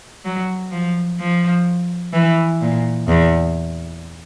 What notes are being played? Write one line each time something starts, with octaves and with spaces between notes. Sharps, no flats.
F#3
F3
F3
E3
A#2
E2